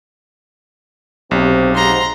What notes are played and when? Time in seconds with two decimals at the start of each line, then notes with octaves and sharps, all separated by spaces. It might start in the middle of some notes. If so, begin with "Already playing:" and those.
1.31 B1 C3 C4 G4
1.75 G#2 C3 C4 A#5 C6